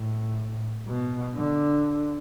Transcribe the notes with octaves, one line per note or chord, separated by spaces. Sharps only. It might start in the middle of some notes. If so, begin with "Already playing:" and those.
Already playing: A2
B2
D3